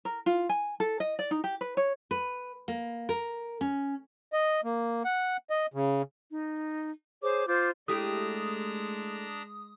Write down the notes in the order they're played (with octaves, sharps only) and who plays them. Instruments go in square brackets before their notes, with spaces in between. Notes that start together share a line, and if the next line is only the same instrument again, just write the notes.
[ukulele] A#4
F4
G#5
A4
D#5
D5
D#4
G4
B4
C#5
[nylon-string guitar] B4
A#3
A#4
C#4
[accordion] D#5
A#3
F#5
D#5
C#3
[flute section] D#4
G#4 C5 C#5 D6
F4 C5 D6 G6
[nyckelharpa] G#3 [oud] A3 E4 G4 [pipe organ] D4 A#5 [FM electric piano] D#6